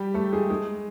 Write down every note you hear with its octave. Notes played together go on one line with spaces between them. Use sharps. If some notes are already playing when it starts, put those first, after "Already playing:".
Already playing: G3 G4
A3 A4
G#3 G#4
G#3 G#4